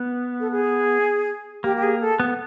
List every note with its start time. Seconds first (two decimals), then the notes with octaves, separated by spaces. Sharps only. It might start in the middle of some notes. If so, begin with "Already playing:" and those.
Already playing: B3
0.40 A4
0.51 G#4
1.64 A#3 G4
1.76 G4
1.83 G#4
2.01 A4
2.20 B3